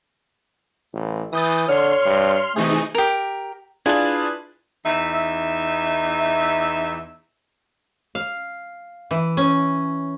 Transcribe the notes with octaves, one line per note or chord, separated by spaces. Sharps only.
A1
E3 D#6 G6 A6
D3 C#5 C6 F6
G2
C3 E3 A3 D#4 G#4
G4 A#4
D4 E4 F4 G#4 B4
E2 D#4 E5
F5
E3
C#4